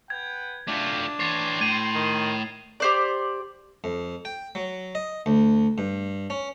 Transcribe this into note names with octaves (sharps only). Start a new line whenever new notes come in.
B4 F#5 G5 G#6
A3 D4 F4 F#4 F5 G5
E3 C#5 G5 C6 A6 C7
A2 G#6 D#7
D#3
G4 C5 D5
F2
G5
F#3
D#5
D2
G2
C#4